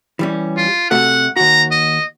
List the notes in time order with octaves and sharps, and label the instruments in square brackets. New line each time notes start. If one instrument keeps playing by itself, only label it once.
[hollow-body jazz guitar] E3 G3 C#4
[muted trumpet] F4
[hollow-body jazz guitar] C3 A3 F#4 [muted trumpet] F#5
[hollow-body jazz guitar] D#2 F#4 [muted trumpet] A#5
[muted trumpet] D#5